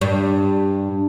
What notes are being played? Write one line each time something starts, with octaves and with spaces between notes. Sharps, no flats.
G2